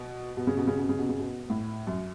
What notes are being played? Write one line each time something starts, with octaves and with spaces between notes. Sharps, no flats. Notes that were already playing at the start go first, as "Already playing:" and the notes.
Already playing: B2
B2
C#3
B2
C#3
B2
C#3
B2
C#3
B2
A2
F#2